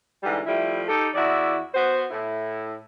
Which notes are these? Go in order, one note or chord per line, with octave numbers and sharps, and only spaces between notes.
G#2 D3 E3 G3
F3 G3 A3 E4
D#4 G4 A4
E2 E4 F#4 D5
B3 F#4 C5
A2 E4